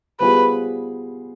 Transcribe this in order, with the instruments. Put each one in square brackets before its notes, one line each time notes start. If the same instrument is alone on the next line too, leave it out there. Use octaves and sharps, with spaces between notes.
[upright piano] G3 B3 F4 G#4 C5 [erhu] B4